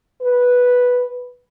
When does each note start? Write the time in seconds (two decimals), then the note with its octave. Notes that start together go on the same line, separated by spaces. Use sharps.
0.22 B4